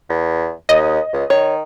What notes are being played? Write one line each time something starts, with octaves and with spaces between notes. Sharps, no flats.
E2
D#2 D#5
C#2
D#3 C#5